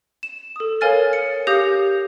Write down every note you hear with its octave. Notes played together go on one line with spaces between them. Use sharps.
E7
A4 D#6
A#4 C#5 F5 G#5 F6 A6
C#7
G4 F5 D#6 G6 A#6